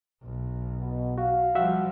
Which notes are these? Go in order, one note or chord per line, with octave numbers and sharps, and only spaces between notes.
B1
B2
F#4 F5
F3 G3 F#4 E5 F#5